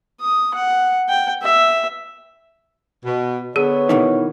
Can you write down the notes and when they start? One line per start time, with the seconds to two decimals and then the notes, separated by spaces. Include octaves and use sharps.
0.20 D#6
0.54 F#5
1.09 G5
1.42 E5
3.04 B2
3.56 D3 B3 G#4 C#5
3.89 B2 D#3 E3